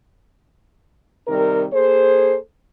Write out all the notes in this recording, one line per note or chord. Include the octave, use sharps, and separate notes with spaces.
C3 D#3 G3 A#4
A#3 G#4 A4 C5